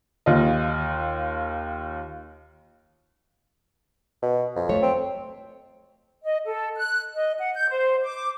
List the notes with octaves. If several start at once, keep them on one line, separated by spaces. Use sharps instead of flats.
D#2 F4 D#5
B2
F2
A3 C#5
C4
D#5
A4
F#6
D#5
F#5
G6
C5
D6